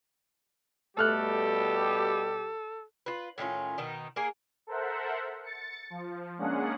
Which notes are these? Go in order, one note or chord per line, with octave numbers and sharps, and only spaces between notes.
B2 G3 A3 G4 A4 F6 F#6
F4 B4
A2 D#3 C#4 F4
B2 D#3 D#4
A#3 G#4 A#4
A4 A#4 C5 E5 F#5
A6 C#7
F3
G#3 A#3 C#4 D4 G#4 F#5